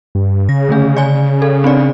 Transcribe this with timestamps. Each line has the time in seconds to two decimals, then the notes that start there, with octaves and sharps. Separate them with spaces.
0.15 G2
0.49 C#3 A#6
0.69 D3 A3 G#4
0.97 D5 G#5
1.42 A4
1.64 C4 D4 D5